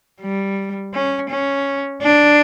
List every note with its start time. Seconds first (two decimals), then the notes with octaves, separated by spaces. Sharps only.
0.22 G3
0.94 C#4
1.29 C#4
2.02 D4